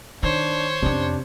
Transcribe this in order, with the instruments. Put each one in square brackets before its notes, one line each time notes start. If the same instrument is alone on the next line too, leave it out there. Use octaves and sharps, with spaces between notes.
[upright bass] D#3 [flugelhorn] D4 [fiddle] C5 C#5
[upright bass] F2 C#4 [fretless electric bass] C3 [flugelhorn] D4